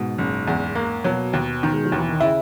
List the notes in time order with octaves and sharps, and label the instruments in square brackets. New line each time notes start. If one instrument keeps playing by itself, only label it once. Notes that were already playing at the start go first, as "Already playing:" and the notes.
Already playing: [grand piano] G#2 [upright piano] B2
[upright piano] F#1
E2
A#3
[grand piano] B2 [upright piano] F#3
[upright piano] D#2
D#3
[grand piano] G#3
F#3
[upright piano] D#2 [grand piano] E3
[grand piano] D#3
[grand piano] C#3 [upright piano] E4